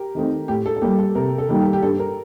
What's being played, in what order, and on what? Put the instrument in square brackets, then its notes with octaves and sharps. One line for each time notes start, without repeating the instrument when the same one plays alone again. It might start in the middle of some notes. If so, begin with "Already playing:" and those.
Already playing: [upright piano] G4 A#4
[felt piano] D#3 A3 C4 D#4
[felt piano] A2 [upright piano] G4
[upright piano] A4
A4
[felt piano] G3 A#3 [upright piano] G4
[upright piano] A4
[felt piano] C3 [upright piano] A#4
[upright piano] A4
[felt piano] D#3 G3 A#3
[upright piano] G4
G4
[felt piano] G2 [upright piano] A4
[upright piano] A#4